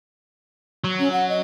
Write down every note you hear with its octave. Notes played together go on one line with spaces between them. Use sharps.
F#3
C#4
F#5
D#5